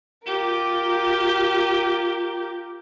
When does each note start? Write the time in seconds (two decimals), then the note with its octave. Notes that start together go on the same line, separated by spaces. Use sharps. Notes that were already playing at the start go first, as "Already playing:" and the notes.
0.25 F4 G4 A#4